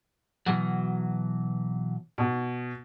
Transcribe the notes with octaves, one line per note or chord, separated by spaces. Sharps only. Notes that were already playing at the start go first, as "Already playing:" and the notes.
B2 E3 F#3
B2